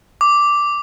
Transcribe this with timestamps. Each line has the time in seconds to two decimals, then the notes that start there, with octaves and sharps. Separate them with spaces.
0.21 D6